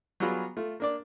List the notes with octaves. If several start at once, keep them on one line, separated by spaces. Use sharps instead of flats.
F#3 G3 B3 F4 F#4 G#4
A3 F4
A#3 D4 D5